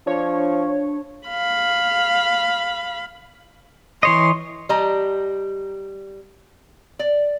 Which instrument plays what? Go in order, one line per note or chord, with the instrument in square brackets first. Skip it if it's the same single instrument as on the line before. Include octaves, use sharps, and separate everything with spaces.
[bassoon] F3 [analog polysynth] D4 C#5
[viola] F5 B5
[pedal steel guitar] E3 C#5 D#5 [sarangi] C6
[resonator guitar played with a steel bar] G3 G4 D#5 A5 A#5
D5